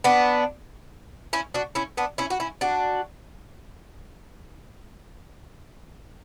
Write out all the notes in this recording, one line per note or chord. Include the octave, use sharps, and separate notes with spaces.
B3 D4
C#4 E4
D4 F#4
C#4 E4
B3 D4
C#4 E4
F#4
C#4 E4
D4 F#4